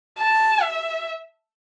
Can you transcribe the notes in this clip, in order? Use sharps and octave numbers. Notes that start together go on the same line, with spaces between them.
A5
E5